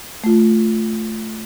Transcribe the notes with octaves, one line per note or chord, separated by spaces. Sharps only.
A3 F4